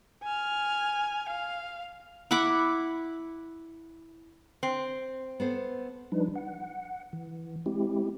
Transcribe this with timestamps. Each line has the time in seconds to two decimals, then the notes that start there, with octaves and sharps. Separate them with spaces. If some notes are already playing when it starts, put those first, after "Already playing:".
0.23 G#5 F6
1.29 F5
2.31 E4 F#5 B5 D6
4.63 C4
5.40 B3 A4 C5
6.12 F3 G3 D4 D#4 B4
6.36 F#5
7.13 E3
7.66 G#3 C4 E4 G4